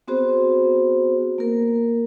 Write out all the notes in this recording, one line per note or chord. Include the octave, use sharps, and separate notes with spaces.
B3 C4 F#4 G#4 C5
A#3 A#4